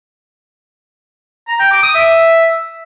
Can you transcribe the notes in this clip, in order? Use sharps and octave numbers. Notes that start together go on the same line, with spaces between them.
A#5
G5
D6
D#6
E5